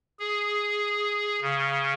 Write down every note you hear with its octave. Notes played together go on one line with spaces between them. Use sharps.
G#4
C#3